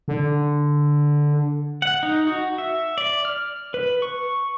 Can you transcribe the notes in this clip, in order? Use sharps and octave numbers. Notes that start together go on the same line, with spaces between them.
D3
F#5
D#4
F#4
E5
D5
F6
B4
C#6